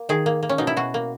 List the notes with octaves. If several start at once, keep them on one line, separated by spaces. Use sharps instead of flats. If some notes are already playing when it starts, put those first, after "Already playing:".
Already playing: A#3
D#3 G#4
A#3
A#3
C#4
B2 D#4
E4
B2 F#4
A#3